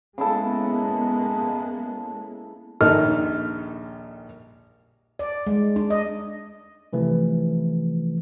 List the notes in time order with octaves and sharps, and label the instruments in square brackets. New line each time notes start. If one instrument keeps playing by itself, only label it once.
[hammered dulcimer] C#3 E4 A4 [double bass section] G#3 A#3 B3
[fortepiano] A#1 D#2 D#3 A4 D#5 F6
[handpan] D5
G#3
D4
D#5
[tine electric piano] C3 E3 F3 A3